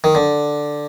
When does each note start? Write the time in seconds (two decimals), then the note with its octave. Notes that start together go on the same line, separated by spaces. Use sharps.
0.04 D#3
0.15 D3